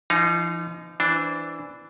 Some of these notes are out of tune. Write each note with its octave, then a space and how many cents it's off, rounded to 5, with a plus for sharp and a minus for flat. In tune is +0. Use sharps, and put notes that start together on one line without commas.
F3 -45 D#4 +0 F5 +5
E3 +0 D4 +0 C5 -10